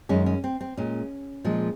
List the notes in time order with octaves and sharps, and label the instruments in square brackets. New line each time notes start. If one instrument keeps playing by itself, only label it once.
[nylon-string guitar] F#2 D#3 G#3 C#4
C#4
C4
C4
A#2 G#3 C#4
A#2 F3 G#3